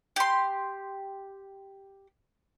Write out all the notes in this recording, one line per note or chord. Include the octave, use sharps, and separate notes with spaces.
G4 C6